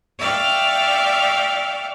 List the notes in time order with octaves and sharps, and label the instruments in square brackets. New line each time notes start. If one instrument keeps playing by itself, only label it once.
[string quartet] D5 E5 F5 G5 C#6